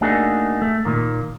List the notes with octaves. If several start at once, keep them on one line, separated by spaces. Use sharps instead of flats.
A3 A#3 D4 D#4 F#4 G#4
A3
A#2 D#3 A#3